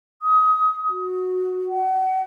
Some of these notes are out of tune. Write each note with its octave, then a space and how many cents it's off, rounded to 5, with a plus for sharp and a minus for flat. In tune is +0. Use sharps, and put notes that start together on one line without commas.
D#6 +25
F#4 -10
F#5 +30